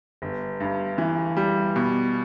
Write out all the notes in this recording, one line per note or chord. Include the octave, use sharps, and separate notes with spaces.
G1
G2
E3
G3
B2